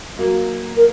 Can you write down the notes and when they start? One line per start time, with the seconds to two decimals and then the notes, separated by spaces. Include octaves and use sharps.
0.18 F#3 A#3
0.77 A#4